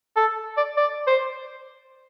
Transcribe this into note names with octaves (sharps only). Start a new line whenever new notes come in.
A4
D5
D5
C5